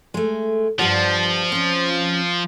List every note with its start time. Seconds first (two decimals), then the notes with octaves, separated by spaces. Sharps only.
0.14 G#3 A3
0.79 G2 F3 G4 F#5
1.52 C4 C#4